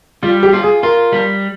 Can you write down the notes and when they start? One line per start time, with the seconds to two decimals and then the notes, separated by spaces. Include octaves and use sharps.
0.23 G3 F4
0.43 G4
0.53 F4
0.63 G#4
0.83 F4 A#4
1.12 G3